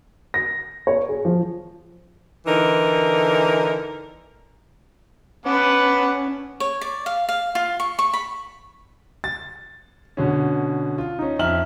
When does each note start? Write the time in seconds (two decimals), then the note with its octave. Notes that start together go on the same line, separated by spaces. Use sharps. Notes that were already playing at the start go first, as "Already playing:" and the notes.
0.34 A#6
0.87 C#5
1.09 G#4
1.25 F3
2.46 D3 E3 D#4 A#4
5.46 B3 C#4 B4 F#5 A5 D6
6.60 C#5
6.81 D5
7.06 F5
7.29 F5
7.55 F4
7.80 C#6
7.99 C#6
8.14 B5
9.24 A6
10.17 B2 D3 C#4
10.98 F4
11.19 C#4 D#4
11.39 F2 D#4 E5 F6 F#7